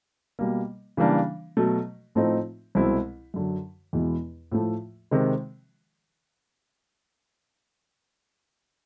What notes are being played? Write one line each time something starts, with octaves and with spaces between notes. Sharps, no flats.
B2 G3 A#3
C#3 E3 G3 A#3 D4
B2 F#3 A3
A2 F3 A3 C4 D#4
C2 B2 G#3 C4 E4
F#2 D3 F#3
E2 B2 G#3 B3 E4
A2 F3 A3
C3 D#3 G#3